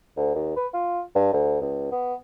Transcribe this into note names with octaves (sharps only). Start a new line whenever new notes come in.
D2
D#2
B4
F4
G2
D2
C#2
B3